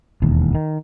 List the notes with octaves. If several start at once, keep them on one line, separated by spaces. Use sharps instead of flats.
E1 D#2
D#3